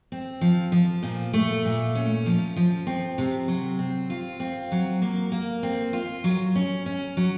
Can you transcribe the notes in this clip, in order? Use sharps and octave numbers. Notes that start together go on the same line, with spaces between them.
C4
F3
F3
A#2
A3
A#2
C#4
F3
F3
C4
C3
F#3
C4
F4
C4
F#3
A#3
A#3
C4
F4
F#3
C#4
C#4
F#3